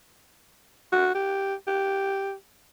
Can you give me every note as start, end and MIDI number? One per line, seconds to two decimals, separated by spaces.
0.92 1.14 66
1.15 1.54 67
1.67 2.34 67